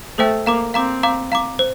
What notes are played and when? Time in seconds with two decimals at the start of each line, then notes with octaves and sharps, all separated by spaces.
0.18 A3 A4 C5 E5 G5
0.46 A#3 F5 A#5 D6
0.74 C4 F5 A#5 D6
1.03 F5 A#5 D6
1.32 F5 A#5 D6
1.59 C5